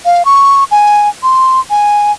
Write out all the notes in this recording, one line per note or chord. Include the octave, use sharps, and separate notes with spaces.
F5
C#6
G#5
C6
G#5